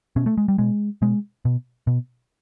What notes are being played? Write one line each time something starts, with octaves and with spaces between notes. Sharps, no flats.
B2 C#4
A3
G#3
G3
B2 G#3
B2 G#3
B2
B2